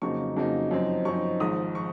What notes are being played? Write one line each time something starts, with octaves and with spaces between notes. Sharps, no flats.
F2 C#3 F#3 A#3 D#4 C#6
F2 C#3 F#3 A#3 D#4
F#2 F3 C4 D#4
F#2 F3 C4 D#4 C#6
G#1 G#2 F3 D#6
F3 C#6